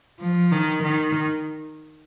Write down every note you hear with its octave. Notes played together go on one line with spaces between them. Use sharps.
F3
D#3
D#3